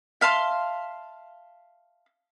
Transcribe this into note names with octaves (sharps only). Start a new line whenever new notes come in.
E5 F5 A5 C6